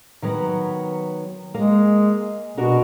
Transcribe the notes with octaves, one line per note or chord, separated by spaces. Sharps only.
D#3 F#3 B3
G#3 A#3
B2 D4 F#4 A#4